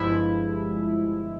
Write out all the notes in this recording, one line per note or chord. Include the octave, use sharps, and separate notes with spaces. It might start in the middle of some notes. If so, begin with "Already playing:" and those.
Already playing: G1 G2 F3 G#3 E4